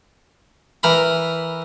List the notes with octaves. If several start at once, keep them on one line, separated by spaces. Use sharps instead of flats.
E3 A#4 A#5 B5